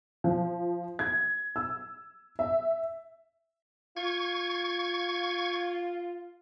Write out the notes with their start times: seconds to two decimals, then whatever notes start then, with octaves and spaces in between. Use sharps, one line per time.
0.24 F3
0.99 G#6
1.56 E6
2.39 E5
3.96 F4 C#6 G#6